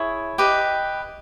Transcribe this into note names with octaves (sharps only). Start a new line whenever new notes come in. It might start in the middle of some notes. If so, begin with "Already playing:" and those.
Already playing: E4 G#4 C#5
G4 B4 D#5